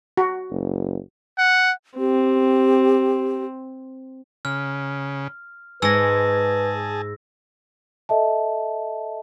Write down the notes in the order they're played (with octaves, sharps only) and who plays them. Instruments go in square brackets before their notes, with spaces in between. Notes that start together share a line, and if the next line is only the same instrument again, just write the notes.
[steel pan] F#4
[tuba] F#1
[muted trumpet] F#5
[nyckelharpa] C4 [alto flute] G4
[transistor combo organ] C#3 [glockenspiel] F6
[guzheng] G#2 G#3 [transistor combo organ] G#4 A5 [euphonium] B4 [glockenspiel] E6 A#6
[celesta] A4 D#5 E5 A5